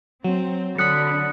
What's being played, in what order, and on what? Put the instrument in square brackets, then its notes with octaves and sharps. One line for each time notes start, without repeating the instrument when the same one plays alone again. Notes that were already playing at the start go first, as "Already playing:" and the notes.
[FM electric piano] F#3 [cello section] C4
[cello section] D3 [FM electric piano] F#3 B5 [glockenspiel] D#6 F#6 C#7